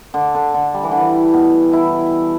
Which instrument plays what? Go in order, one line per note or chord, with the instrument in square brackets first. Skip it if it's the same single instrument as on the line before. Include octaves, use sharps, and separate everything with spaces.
[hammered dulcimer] D3
D3
D3
G3
E3
D3
E3
B2
E4